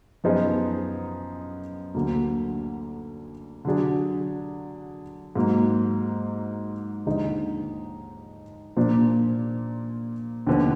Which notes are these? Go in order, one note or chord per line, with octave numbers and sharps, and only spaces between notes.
F#2 F3 B3 D#4 G#4
D2 D3 F#3 A#3
D3 F#3 D4 G#4
G#2 F#3 A#3
D#2 D3 F3 G#3 D#4
A#2 F3 A#3 D4
D#2 D3 F3 B3